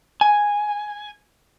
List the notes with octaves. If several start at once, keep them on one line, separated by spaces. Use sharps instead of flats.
G#5